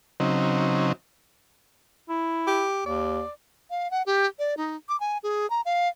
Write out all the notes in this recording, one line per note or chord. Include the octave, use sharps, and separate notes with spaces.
C#3 F#3 C4 D#4
E4
G4
D#2 D5
F5
F#5
G4
D5
D#4
D6
G#5
G#4
A#5
F5